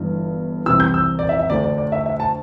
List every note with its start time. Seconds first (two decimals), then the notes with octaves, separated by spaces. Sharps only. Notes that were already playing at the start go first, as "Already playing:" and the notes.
Already playing: G1 G2 E3
0.66 C2 C3 E3 E6
0.80 G6
0.94 E6
1.19 D5
1.29 E5
1.39 E5
1.50 D2 D3 D5
1.64 D5
1.78 D5
1.92 E5
2.06 E5
2.20 A5